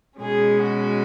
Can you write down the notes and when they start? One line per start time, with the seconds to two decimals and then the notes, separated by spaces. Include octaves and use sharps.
0.20 B2 G#3 C#4 G#4
0.61 F#4